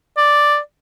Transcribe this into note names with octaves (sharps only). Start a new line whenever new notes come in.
D5